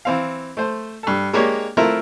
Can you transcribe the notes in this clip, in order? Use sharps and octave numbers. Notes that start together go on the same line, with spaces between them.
E3 C4 F5
A3 C5
G2 A4
G#3 A#3 D4 G4 C#5
A3 C4 E4 F4 A#4